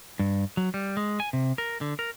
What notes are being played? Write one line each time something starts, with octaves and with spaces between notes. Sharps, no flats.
G2
F#3
G3
G#3
G#5
C3
A#4
D3
A#4